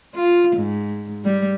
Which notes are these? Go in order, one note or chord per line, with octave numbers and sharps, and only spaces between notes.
F4
G#2
G3